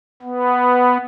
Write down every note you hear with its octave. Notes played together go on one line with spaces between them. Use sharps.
B3